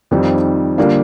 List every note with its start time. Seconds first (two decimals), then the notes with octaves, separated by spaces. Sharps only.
0.11 F2 D#3 G3 C4 D#4
0.78 D3 G3 A#3 D4 F4